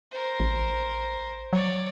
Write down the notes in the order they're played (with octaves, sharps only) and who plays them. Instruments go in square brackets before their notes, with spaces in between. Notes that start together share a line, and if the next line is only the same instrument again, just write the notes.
[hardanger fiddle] A#4 C5
[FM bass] A1
[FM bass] F#3 [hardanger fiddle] C#5 D5